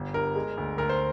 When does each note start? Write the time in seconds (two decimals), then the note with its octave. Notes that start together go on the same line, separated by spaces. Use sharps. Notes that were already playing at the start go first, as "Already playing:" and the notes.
Already playing: G1
0.14 G2 A#4
0.35 G#3
0.58 D2
0.78 D2 A#4
0.89 C5